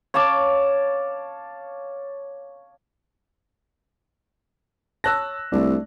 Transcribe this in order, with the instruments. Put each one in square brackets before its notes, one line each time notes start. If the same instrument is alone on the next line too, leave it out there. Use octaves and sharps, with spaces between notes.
[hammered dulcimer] C#5 F5 A5 D6
[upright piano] C#5 A5 [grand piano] E6 F#6 A#6
[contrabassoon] C2 [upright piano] A3 D4